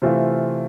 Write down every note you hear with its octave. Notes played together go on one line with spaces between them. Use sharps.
C3 E3 A3 C4 F4